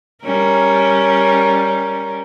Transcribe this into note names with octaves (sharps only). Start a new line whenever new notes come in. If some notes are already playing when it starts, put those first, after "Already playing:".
G3 C#4 A#4